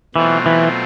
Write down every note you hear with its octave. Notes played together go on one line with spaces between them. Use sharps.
B2 E3 F#3 A3 C4 F4
E3